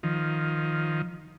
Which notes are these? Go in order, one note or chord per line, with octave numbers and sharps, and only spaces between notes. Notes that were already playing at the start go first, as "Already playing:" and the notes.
D#3 F3